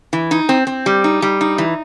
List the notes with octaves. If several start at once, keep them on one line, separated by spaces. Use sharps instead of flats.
E3
D#4
C4
C4
G3
D#4
G3
D#4
E3